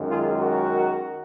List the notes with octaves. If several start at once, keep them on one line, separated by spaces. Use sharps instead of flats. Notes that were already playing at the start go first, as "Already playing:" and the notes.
Already playing: F#2 D#3 G#3
F4 G#4
F#4 A#4